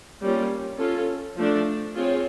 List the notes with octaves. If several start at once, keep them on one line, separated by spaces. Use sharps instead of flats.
G3 A#3 C#4 F4
C#4 F4 A4
F3 A3 D4
C4 F4 G#4 C#5